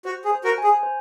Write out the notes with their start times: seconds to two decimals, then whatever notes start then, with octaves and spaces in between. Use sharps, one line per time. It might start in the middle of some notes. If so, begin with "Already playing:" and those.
0.05 F#4 C5
0.25 G#4
0.31 C5
0.44 F#4 A#4
0.58 G#5
0.64 G#4
0.83 C5